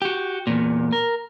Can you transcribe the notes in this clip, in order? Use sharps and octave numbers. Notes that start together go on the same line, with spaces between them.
F#4 G4
E2 A#2
A#4